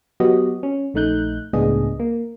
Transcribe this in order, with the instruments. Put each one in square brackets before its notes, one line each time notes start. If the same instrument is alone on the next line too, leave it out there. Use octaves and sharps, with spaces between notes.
[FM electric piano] F#3 B3 F#4 G4 D#5
C#4
A#1 A3 D#4 F#6 G6
C#2 A2 B3 D4 G#4 D#5
A#3